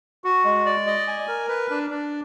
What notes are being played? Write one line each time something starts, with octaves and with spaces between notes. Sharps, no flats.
F#4
G#3
D5
D#5
G#5
A#4
B4
D4
D4